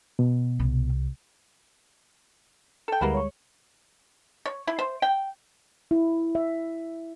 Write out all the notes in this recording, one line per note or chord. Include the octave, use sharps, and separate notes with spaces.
B2
C2
A4 G5
D2 G3 G#3 A#3 B3 E4
C#5 C#6
C#5
E4
C5
G5
E4
E5